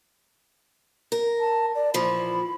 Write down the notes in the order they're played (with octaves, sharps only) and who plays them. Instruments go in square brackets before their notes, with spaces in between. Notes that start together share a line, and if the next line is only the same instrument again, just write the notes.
[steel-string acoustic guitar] A#4
[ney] A5
D5
[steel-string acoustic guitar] A#2 E3 F3 [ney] B5